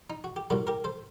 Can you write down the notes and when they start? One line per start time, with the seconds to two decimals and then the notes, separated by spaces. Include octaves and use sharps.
0.10 D#4
0.24 F#4
0.36 G4
0.50 C2 A#2 G3 A#3 F#4 A4
0.67 G4 A#4
0.84 A4 C5